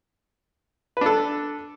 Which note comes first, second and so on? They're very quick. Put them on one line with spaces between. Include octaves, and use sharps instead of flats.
B4 D4 A4